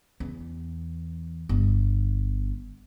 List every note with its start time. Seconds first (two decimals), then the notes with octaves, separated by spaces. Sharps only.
0.20 E2
1.49 G1